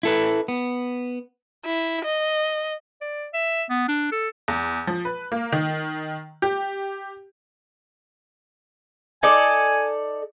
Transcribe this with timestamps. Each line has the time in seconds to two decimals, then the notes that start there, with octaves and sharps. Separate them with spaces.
0.03 E4 A4 B4
0.48 B3
1.65 E4
2.05 D#5
3.02 D5
3.34 E5
3.70 B3
3.88 D4
4.12 A4
4.48 E2
4.87 F3
5.05 B4
5.32 A#3
5.52 D#3
6.42 G4
9.23 D#4 A4 D5 G#5